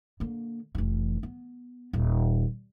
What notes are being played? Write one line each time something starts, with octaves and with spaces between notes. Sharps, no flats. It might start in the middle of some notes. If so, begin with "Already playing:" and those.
D3 A#3
F1 E3
B3
D#1